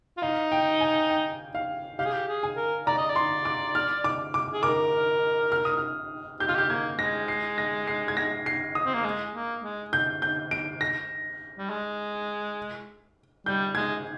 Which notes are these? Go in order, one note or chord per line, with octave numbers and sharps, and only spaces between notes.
F4
D#4 F5
G5
G#5
G5
F5
G4 F5
G#4
G4
G#4
G#5
A#4
D5 A#5
D#5
D5
C6
D6
F6
D6
D6
G#4
A#4 D6
F6
D#6
F6
G4 G6
F4 F6
G4 G6
A#3 G#6
G#3 A#6
C7
A#6
C7
G#6
A#6
C7
D#6
C4
A#3
G#3
A#3
G#3
G6
G6
D7
A#6
G3
G#3
G3 G6
G#3 G#6